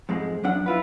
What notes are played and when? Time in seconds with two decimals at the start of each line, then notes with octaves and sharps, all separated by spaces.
0.09 F2 G#2 F3 G#3
0.44 F#2 F3 D4 F#5
0.66 E4 F4 B4